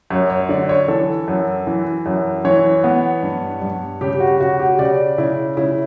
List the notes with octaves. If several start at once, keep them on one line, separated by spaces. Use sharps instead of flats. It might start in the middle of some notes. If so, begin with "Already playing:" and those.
F#2 C#5
C#5
D3 D5
C#5
E3 A4
F#2
E3
F#2
E3 C#5
B3
G2
G2
C#3 G4
F#4
C#3 F#4
G4
C#3 D5
C#3 E4
C#3 E4